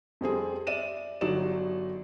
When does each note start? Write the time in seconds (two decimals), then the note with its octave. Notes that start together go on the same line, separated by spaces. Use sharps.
0.21 F2 G3 C4 G#4
0.67 D5 E5 D#7 E7
1.21 G1 F#3 D#4 D5 E7